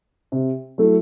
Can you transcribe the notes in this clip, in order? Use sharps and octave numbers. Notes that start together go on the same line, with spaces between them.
C3
F#3 A3 E4